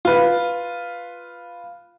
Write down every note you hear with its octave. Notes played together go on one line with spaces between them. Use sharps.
F4 B4